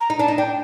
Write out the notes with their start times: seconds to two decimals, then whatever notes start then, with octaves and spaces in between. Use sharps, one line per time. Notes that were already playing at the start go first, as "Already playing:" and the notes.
0.01 A#5
0.10 D#4
0.19 D4 A5
0.28 D#4
0.38 D4 G5